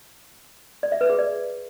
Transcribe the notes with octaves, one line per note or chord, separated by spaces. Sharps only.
D5
E5
B4
G#4
D5